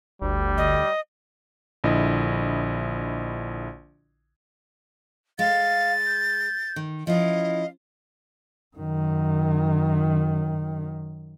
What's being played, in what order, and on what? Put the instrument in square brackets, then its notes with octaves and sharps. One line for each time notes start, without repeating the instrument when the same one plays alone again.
[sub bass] G1 [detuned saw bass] D2 [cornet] G3
[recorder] D#5
[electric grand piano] A#1 D3 E4 D#5
[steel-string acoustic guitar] G#3 [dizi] F5 [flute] A6
[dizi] G6
[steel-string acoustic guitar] D#3
[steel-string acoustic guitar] F3 C#4 E4 [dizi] D#5 [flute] F5
[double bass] F#2 D#3